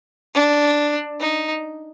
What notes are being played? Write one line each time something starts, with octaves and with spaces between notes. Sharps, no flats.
D4
D#4